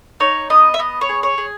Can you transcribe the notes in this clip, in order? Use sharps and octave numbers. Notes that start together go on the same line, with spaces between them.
D#4 C#5
B3 D#5
E5
B3 D#5
C#5
G#4
C#5
G#4